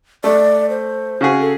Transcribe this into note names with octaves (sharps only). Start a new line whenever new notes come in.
A3 D5
C5
C#3 F#4 G#4
A4